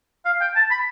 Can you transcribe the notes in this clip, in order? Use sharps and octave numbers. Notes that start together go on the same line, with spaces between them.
F5
G5
A5
B5